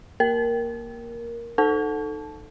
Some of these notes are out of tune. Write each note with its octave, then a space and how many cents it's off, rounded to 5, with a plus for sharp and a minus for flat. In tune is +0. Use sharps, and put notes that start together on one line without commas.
A#3 +0 A#4 +5
D#4 -20 A4 +0 A5 -15